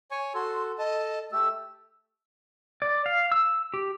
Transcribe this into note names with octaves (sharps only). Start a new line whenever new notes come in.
C#5 G#5 C#6
F#4 A4 C6
A4 D#5 A5
A3 G4 E6
D5
F5
E6
G4